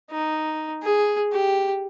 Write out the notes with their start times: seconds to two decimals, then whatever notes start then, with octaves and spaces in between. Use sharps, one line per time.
0.11 D#4
0.82 G#4
1.32 G4